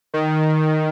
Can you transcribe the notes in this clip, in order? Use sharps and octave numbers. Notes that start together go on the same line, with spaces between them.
D#3